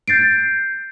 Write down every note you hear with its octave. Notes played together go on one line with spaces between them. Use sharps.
G6 A6 C7 D7